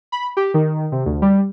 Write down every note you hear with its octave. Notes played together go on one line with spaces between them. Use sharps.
B5
G4
D#3
C3
D2
G3